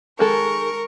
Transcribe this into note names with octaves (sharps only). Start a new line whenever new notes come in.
D#3 G#3 A4 A#4 C#6